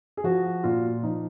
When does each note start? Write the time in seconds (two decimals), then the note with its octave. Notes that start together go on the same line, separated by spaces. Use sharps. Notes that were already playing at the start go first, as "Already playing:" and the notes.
0.17 G#4
0.24 F3 F#4
0.64 A#2 F4
1.03 F3 D#4